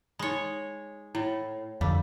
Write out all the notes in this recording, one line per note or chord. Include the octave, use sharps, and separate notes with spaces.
G#3 D#4 C#5 B5
A2 E4
F2 D3 G3 F5